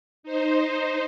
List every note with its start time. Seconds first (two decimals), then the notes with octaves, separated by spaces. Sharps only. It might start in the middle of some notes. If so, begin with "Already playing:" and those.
0.23 D#4 C5